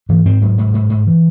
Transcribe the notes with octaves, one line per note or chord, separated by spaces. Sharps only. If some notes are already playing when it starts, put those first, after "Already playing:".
G#2 E3
G#2 C4
G#2 F#3
G#2
G#2
G#2
E3